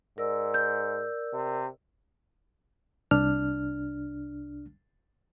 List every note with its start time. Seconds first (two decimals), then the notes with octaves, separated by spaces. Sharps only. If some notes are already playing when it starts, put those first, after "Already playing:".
0.18 G#2 A#4 D5 E6
0.54 G6
1.33 C3
3.11 C2 D4 F6